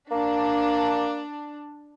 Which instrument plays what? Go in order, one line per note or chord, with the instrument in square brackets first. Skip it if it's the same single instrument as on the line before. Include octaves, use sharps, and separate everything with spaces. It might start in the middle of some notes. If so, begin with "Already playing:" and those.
[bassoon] A#3 [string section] D4